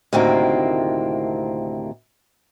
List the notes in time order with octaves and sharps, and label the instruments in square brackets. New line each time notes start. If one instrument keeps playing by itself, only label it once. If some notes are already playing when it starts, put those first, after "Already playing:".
[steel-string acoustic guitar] D2 A2 C3 D#3 A#3 C4